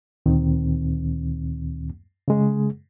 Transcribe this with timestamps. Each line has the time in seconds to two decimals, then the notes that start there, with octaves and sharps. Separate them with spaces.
0.26 D2 A#2 D#3 C4
2.28 C#3 G#3 G#4